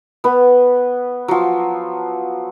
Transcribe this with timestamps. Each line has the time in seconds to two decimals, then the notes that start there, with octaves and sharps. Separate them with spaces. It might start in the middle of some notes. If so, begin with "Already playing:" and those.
0.24 B3 B4
1.28 F3 F#3